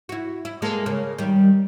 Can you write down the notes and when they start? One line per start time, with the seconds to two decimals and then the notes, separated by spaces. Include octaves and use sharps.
0.09 E4 F#4
0.45 E4
0.62 G#3 A#3 A4
0.86 C#3 A#3
1.18 D#3 G3